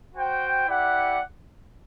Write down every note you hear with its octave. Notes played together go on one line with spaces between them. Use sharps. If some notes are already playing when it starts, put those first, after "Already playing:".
F#4 C5 G5
E4 G4 D5 F#5